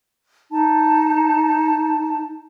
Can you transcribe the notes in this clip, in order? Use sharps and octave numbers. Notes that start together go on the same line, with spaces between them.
D#4 A5